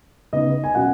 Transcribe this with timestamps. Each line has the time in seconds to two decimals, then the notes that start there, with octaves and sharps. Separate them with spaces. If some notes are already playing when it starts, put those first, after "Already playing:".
0.33 C#3 B3 D#4 D#5
0.64 G#5
0.75 B2 F#3 C#4 F#5